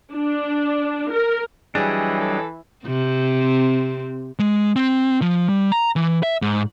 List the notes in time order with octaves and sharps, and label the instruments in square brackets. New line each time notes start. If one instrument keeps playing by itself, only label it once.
[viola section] D4
A#4
[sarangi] E3 [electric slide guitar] F#3 G3 D4 [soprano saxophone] G#4 [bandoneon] C#5 D#5 G5
[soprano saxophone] A4
[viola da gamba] C3 C4
[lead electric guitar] G#3
C4
F3
G3
A#5
E3
E5
G#2